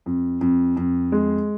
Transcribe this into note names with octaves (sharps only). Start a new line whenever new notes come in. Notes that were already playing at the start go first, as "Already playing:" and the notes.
F2
F2
F2
G#3